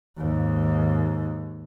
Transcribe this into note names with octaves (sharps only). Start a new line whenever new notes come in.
D#2 G#2